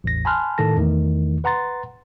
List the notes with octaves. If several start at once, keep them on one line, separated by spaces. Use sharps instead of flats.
A1 E2 A#6
G#5 A5 B5 C6 F6 F#6
A2 D#3 A4 A5 A#6
E2 D#3 E3 A3
B4 F#5 A#5 C6 A6